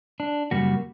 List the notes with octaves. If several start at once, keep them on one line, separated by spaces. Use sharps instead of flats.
D4
F#2 C#3 G3 A#3 F#4